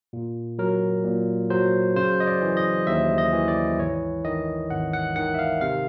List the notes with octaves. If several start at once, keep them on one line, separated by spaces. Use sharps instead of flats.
A#2
F#3 A#4
A#2
F#3 C5
C#3 C5
D#5
D5
E3
D#5
D#2 E5
D#5
E3
D5
G#1 C#5
D#3 D#5
G#1 F#5
F#5
D#3 F#5
E5
F5
C3 F5